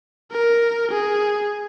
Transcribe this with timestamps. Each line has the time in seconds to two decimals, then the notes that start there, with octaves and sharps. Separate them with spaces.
0.32 A#4
0.91 G#4